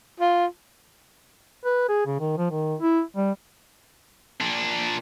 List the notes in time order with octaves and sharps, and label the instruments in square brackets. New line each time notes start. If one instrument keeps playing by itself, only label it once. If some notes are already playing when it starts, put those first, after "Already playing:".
[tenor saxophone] F4
[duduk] B4
G#4
C#3
D#3
F3
D#3
E4
G3
[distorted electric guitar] A#2 D4